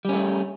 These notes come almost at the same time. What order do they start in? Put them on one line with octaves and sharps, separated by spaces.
G3 C#4 A3